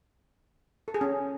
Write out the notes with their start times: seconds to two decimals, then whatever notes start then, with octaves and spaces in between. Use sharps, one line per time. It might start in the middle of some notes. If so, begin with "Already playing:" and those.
0.88 A4
0.94 G#4
1.01 C#4